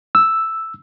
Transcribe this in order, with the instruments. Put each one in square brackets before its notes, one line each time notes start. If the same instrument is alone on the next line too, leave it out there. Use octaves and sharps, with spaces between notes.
[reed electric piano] E6